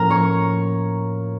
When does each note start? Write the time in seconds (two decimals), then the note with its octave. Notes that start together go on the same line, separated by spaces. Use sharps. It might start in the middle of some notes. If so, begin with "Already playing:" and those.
Already playing: A2 F3 A#3 C#4 A#4 A#5
0.10 C#5 C#6